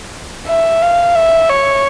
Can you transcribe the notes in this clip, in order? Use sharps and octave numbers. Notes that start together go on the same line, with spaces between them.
E5
F5
E5
C#5